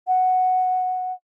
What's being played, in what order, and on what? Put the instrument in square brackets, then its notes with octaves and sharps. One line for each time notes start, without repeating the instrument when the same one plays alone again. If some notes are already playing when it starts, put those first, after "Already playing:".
[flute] F#5